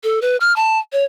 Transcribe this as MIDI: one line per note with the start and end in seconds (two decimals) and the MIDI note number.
0.04 0.19 69
0.22 0.36 71
0.41 0.54 89
0.56 0.79 81
0.93 1.04 73